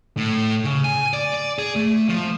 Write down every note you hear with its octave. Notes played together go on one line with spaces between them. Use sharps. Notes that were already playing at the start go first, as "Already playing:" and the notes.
A2
C#3
G#5
D5
D5
G#4
A3
F3